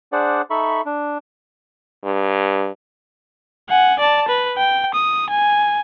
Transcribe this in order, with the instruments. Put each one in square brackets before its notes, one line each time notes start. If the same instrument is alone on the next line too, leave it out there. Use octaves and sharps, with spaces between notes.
[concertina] D4 G#4 C5 D5 F#5
D#4 A4 E5 B5 C#6
D4
[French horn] G2
[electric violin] F#5 G#5
D5 A5
B4
G5
D#6
G#5